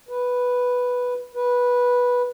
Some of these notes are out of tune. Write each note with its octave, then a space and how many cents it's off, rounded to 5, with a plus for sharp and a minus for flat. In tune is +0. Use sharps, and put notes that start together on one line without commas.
B4 +0
B4 -10